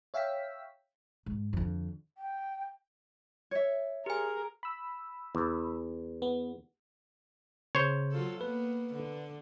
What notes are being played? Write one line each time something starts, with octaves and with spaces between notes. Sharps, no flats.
C#5 E5 F5 G5 E6 B6
G#2
F2 D3
G5
C#5 E5
G4 G#4 A#4 G#5
B5 E6
E2
B3
C#3 C5 C#5
F#3 F4 A4
A#3 B3 B4
D3